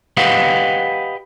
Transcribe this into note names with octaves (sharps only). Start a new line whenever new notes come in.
G4 B4 D#5 F5 F#5